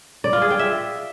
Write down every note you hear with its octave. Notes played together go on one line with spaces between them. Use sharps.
D5
F4
G#4
G5
E5